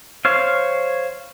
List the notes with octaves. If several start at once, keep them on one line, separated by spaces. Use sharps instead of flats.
C5 C#5 F5